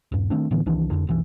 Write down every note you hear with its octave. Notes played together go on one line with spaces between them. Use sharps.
D#1 G2
D#3 A3 C4 D4
A2 D3 E3 B3
C2 D#3 E3 D4
F1 A#1 F2 D3
F1 B1 E3